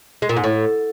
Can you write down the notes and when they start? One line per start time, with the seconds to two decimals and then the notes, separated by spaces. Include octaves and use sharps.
0.22 G#3
0.29 A#2
0.37 G#2
0.44 A2